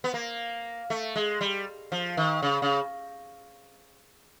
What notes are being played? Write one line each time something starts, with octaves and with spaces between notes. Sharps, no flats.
B3
A#3
A3
G#3
G3
F3
D#3
C#3
C#3